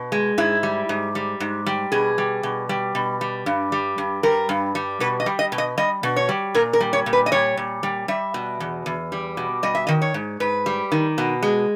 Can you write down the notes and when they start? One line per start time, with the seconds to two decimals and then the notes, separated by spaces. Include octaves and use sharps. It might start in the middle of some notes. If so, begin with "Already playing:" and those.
Already playing: B2
0.12 G#3
0.38 G#2 E4
0.63 G3
0.89 G#2
1.15 G3
1.40 G#2
1.66 G3
1.92 B2 G#4
2.18 G3
2.43 B2
2.69 G3
2.95 B2
3.21 G3
3.46 G2
3.72 G3
3.98 G2
4.23 G3 A#4
4.49 G2
4.75 G3
5.00 B2 B4
5.20 D#5
5.26 G3
5.39 D#5
5.52 B2
5.58 D#5
5.78 G3 D#5
6.03 B2
6.16 C#5
6.29 G3
6.55 A#2 A#4
6.73 A#4
6.80 G3
6.93 C#5
7.06 A#2
7.13 B4
7.26 D#5
7.32 G3 C#5
7.57 A#2
7.83 G3
8.08 G3 E5
8.34 B2
8.60 E2
8.86 E2
9.12 G3
9.37 B2
9.63 G3 D#5
9.75 E5
9.87 D#3 D#5
10.02 C#5
10.14 G#2
10.40 G#2 B4
10.66 G3
10.92 D#3
11.18 B2
11.43 G#3